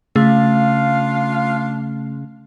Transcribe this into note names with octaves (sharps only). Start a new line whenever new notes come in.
C#3 A3 D4 F4 F5